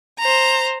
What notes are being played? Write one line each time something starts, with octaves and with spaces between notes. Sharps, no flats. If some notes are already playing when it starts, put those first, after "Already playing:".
C5 A#5